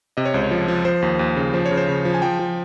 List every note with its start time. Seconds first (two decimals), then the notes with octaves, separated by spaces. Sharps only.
0.17 C3 D#5
0.25 C#5
0.34 C#2 C5
0.43 C#5
0.51 F3
0.68 F3
0.85 F3 C5
1.02 D#2
1.19 D#2
1.37 C#3
1.54 F3 C5
1.66 C#5
1.71 C#3
1.77 C5
1.88 C#3
2.05 F3
2.14 G#5
2.22 F3 G5
2.39 F3